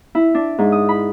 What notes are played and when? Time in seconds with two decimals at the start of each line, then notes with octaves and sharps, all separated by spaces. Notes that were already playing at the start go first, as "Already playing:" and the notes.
0.15 E4
0.35 D4
0.58 G#2
0.72 D#6
0.89 B5